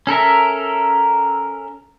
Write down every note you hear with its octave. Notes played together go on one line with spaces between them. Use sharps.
C#4 A4 A#4 E5